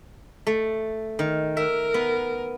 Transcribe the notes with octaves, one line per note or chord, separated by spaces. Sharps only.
A3
D#3
A#4 E5
B3